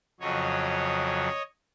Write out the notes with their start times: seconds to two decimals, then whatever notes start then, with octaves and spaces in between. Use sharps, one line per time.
0.20 F2 C#3 F#3 C#5 D#5